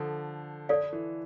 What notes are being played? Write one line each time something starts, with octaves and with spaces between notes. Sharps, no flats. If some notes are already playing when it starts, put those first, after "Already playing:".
Already playing: D3 F3 A4
A4 D5 F5
E3